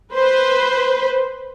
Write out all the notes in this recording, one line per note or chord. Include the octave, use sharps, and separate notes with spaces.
B4 C5